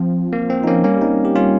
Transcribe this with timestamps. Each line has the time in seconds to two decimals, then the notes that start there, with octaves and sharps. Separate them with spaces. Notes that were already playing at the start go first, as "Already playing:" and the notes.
Already playing: F3 C4
0.33 A#3
0.50 C4
0.64 D#4
0.67 A#3 C#4
0.84 G3 A#3 C#4
1.01 C4 D#4
1.25 G4
1.35 C#4 F4